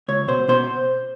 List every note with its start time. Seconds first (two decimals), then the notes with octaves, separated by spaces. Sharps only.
0.08 C#2 C#5
0.28 B2 C5
0.48 B2 C5